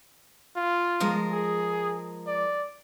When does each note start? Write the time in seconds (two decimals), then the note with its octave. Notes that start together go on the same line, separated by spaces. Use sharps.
0.56 F4
1.00 F3 G#3 A#4
1.32 G#4
2.27 D5